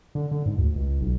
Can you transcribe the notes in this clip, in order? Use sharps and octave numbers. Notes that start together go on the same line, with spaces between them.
D3
D3
G#2
D2
C#2
B1